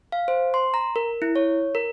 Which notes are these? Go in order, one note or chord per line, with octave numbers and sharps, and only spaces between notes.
F5
C5
C6
A#5
A#4
E4
C#5
A#4